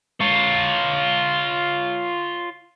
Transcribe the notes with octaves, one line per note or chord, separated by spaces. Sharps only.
F4 C#5